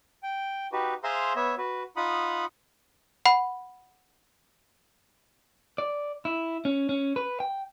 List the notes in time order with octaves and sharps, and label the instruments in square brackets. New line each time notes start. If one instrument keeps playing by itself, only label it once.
[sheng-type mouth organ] G5
D#4 F#4 G4 B4
G#4 C5 E5 F5 A#5 C6
B3 C#5 E5
F#4 B4
D#4 F4 F#5 B5 D#6
[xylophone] F#5 B5
[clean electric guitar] D5
E4
C#4
C#4
B4
G5